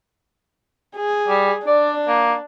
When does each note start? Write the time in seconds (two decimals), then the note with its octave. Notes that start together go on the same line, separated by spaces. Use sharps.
0.97 G#4
1.28 G3
1.67 D4 D5
2.08 A#3